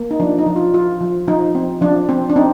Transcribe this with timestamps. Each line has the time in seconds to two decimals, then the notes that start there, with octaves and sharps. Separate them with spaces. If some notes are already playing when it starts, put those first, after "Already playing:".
Already playing: A#3
0.11 D#4
0.20 F3 D4
0.39 D#4
0.47 F3
0.56 F4
0.74 F3 F4
1.01 F3
1.28 F3 D#4
1.55 C4
1.81 F3 D4
2.09 C4
2.30 D4
2.36 C4 D#4